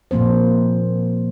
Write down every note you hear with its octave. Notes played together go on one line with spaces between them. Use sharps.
A#2 F3 A#3 C4 C5